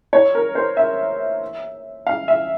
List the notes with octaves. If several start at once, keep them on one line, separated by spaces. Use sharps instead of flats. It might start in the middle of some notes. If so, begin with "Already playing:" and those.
C#5
A#4
C5
E5
F5
E5